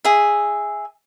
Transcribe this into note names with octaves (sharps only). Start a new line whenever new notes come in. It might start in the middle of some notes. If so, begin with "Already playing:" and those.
G#4 E5